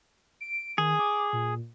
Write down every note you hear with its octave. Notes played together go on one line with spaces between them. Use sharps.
D7
D#3 G#4
D6
A#2